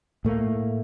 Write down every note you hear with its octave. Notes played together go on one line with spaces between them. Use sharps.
A2 A3 A#3